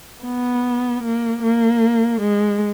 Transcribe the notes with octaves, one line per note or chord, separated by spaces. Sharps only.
B3
A#3
A#3
G#3